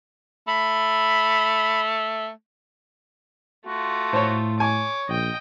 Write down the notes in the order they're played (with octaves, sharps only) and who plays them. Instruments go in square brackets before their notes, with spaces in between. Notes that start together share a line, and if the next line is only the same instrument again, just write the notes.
[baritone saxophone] A3 [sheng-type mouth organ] B5
[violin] A3 F4 [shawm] F#4
[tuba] A2 [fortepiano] C5 C#5
[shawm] C#5 [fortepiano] G#5 [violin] D6
[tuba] A#1 [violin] D#5 G5